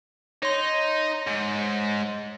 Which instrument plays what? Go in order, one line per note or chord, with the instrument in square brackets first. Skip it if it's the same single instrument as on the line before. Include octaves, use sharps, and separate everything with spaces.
[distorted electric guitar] D#4 [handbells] C#5 C6
[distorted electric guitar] G#2